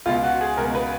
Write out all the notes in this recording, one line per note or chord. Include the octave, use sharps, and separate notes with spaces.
C#2 B2 F4
F#4
G#4
C#2 B2 A#4
B4